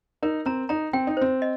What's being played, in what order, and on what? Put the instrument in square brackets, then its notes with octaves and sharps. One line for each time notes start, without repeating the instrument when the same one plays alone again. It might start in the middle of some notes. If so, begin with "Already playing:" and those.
[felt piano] D#4 [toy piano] A#4
[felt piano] C4 [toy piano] A#5
[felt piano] D#4 [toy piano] A#5
[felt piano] C4 [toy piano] G5
[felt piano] D#4
[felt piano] C4 [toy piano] C5
[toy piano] D#5